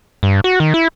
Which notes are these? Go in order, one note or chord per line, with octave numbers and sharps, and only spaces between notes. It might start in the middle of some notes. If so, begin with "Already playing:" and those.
G2
F#4
D#3
E4